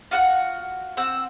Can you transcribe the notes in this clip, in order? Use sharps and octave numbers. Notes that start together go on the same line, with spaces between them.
F4 F#4 F#5 F#6
C4 F#5 E6